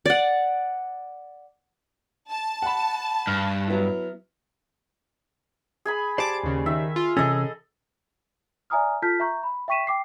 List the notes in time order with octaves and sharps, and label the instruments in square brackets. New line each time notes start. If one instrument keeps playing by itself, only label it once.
[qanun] D5 F#5
[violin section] A5
[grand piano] F#5 B5
[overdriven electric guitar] G2 [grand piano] F6
[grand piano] F#3 B3 E4
[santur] G#4 G#5 B5
[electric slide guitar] G4 C5 D5 [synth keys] A5 D6
[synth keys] D#2 C#3
[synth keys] D#3 [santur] E5
[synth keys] F4
[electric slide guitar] C3 E3 C#4 [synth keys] G#4 [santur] A4 D#5
[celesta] D5 E5 G#5 A#5 D#6 F6
F4 A4 A5 F6 G6 B6
E5 A#5 C#6 G6
B5
E5 G5 C#6 B6 D#7 E7
G5 D6 C7